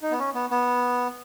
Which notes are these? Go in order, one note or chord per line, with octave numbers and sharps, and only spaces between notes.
D#4
B3
C#4
B3
B3